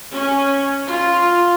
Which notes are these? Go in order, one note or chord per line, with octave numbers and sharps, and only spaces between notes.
C#4
F4